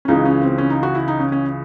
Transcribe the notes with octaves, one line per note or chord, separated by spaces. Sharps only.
C#4
C#2 C#3 E3 D#4
C#4
C4
C#4
D#4
F#4
E4
D#4
C#4
C#4